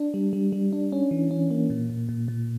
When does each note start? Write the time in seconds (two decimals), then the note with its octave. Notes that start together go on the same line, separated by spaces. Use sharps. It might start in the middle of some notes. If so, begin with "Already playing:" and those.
Already playing: D4
0.14 G3
0.33 G3
0.52 G3
0.73 D4
0.92 C#4
1.11 E3
1.31 C#4
1.51 A#3
1.70 A#2
1.90 A#2
2.09 A#2
2.28 A#2